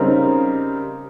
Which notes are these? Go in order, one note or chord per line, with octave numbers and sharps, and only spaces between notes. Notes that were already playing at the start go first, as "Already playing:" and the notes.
Already playing: C#3 G3 C4 D#4 A#4